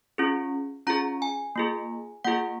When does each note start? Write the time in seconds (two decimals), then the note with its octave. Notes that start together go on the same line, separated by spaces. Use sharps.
0.18 C#4 F4 G#4
0.87 C#4 F4 G#4 A#5
1.22 G#5
1.56 A#3 F4 G#4
2.25 A#3 F4 G#4 F#5